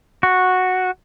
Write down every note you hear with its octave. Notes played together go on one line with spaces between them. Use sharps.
F#4